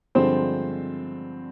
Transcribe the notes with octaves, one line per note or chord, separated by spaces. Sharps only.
G2 D3 F3 G#3 C4 C5